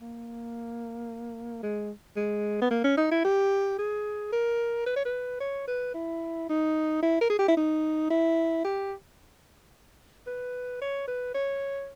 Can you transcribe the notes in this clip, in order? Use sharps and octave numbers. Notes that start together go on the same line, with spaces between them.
A#3
G#3
G#3
B3
A#3
C#4
D#4
E4
G4
G#4
A#4
B4
C#5
B4
C#5
B4
E4
D#4
E4
A#4
G#4
G4
E4
D#4
E4
G4
B4
C#5
B4
C#5